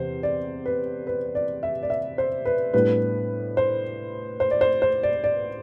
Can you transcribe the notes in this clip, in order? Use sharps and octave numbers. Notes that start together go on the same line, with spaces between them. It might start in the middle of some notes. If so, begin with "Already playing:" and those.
Already playing: E2 C3 C5
D5
B4
B4
D5
E5
D5
E5
C5
B4
A2 G3 B3 D4 B4
C5
C5
D5
C5
C5
D5
D5